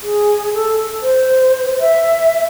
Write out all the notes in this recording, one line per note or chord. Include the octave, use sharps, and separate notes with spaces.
G#4
A4
C5
E5